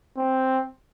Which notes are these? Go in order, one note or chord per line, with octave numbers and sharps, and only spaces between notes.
C4